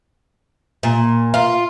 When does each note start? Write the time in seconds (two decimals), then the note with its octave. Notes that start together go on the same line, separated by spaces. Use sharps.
0.83 A#2
1.34 F4